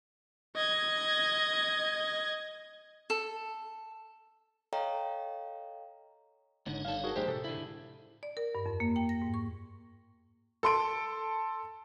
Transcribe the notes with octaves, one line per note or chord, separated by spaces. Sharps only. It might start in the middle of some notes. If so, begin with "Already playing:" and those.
D#5 G#6
A4
A4 C#5 D#5 F5 G5 A#5
F#1 G#2 D3 D#4 C#5
G2 A4 F5
F#4 G#4 A#4
A#1 G#3 G4 C5
A2 C3 A4
D3 E4
D5
A#4
G2
F2
A#3
G5
A#6
G#2
C#6
A4 C6 D7